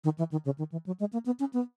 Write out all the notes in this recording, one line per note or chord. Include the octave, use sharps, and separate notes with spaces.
D#3
E3
D#3
C#3
D#3
E3
F#3
G#3
A#3
B3
C#4
B3